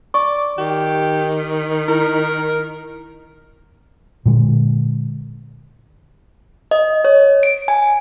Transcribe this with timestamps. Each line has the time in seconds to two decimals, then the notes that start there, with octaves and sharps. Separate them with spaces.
0.14 D5 C#6
0.58 D#3 G4
1.88 E4 A#4
4.26 A#2 D3 G#3
6.71 D#5
7.05 C#5
7.43 D7
7.68 G#5